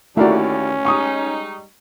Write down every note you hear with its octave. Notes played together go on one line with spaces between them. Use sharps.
D#2 A3 C#4 E4 F#4 A#4 D5
G3 G#3 D#4 C#6 D#6